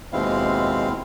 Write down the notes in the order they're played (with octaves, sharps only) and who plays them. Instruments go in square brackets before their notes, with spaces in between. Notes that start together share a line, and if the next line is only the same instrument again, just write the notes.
[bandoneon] D#2 B2 G#3 C4 E4 F5